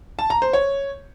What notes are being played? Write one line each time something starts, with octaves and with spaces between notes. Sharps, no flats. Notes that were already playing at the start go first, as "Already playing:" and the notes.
A5
A#5
C5
C#5